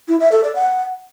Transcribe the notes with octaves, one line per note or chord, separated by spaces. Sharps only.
E4
E5
A4
D5
F#5